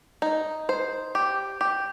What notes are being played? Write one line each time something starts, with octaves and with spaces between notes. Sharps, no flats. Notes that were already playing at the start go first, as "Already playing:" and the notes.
D#4
C5
G4
G4